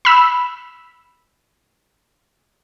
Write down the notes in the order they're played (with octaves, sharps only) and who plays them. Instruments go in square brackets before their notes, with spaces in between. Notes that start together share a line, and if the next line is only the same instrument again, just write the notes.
[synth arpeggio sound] B5 E6